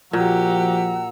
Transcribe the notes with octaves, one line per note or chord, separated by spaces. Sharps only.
A#2 F3 F#4 G4 F#5 A#5 E6